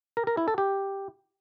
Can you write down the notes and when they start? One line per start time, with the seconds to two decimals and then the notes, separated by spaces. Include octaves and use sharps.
0.17 A#4
0.27 A#4
0.37 E4
0.48 A4
0.58 G4